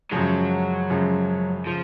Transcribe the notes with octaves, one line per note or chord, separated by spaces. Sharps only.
F#2 C#3 F3 F#3 G#3
F#2 C#3 F3 G#3
C#3 F3